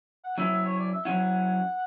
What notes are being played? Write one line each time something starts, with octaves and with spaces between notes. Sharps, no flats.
F#5
F#3 C#4 E4 E5
C#5
D5
E5
F#3 C#4 E4 F#5